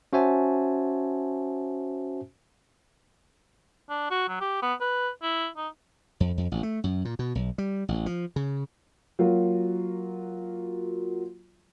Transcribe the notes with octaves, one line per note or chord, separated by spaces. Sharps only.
C#4 F#4 C5 E5 G#5 A5
D4
F#4
F#3
G4
B3
B4
E4
D#4
F2
F2
A1
A3
F#2
A#2
B2
B1
G3
A1
F3
C#3
F#3 A#3 F4 F#4